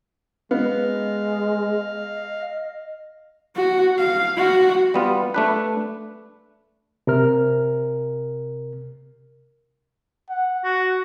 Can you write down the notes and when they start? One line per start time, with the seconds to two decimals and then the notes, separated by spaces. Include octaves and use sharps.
0.51 G#3 B3 D#5 F5
3.56 F#4
3.99 F5
4.37 F#4
4.94 G3 B3 F4
5.34 A3 D4 B4
7.07 C3 A#4 F6
10.30 F#5
10.64 F#4